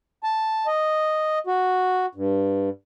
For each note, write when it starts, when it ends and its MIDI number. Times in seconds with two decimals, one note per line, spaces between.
0.23 0.66 81
0.67 1.39 75
1.47 2.06 66
2.15 2.69 43